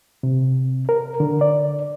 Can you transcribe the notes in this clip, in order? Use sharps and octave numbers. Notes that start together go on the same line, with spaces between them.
C3
A#4
D3
D5